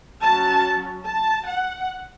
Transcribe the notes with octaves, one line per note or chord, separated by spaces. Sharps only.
F#3 C#4 A5
A5
F#5